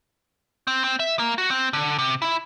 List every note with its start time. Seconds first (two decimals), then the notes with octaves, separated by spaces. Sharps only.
0.67 C4
0.84 C4
1.00 E5
1.19 A#3
1.38 F#4
1.50 C4
1.73 D3
1.98 C3
2.22 E4